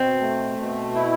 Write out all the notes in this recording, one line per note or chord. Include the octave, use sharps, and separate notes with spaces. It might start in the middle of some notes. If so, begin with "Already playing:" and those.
Already playing: B2 C4
A3
B2
E4